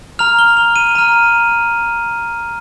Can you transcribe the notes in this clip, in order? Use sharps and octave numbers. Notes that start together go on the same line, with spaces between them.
A#5 F6 F7
G7
F7
D#7
A#5 F6